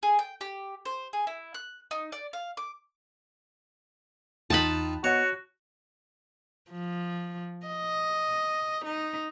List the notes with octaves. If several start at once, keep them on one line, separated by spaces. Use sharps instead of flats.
G#4
G5
G4
C5
G#4
E4
F#6
D#4
D5
F5
D6
E2 D#4 F4 G5 A5 B5 F#6
B3 F#4 C#5 D#5 F#5
F3
D#5
D#4